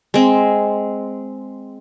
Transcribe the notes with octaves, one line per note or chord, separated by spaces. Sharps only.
G#3 C4